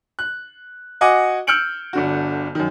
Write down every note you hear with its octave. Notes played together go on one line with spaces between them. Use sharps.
F#6
F#4 D#5 F#5 G#5 D6
E6 F6 G6 C#7 D7 F#7
G1 D3 F#4
F#2 D#3